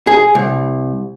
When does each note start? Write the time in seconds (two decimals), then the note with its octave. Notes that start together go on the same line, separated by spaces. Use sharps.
0.07 G#4
0.35 C2